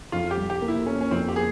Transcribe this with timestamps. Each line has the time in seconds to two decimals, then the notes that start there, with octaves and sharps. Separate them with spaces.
0.12 F2 F4
0.31 G4
0.37 G3
0.50 G4
0.62 A#3
0.68 E4
0.86 A#3 C#4
1.01 C#4
1.11 F2 C4
1.28 G4
1.36 A#3 G#4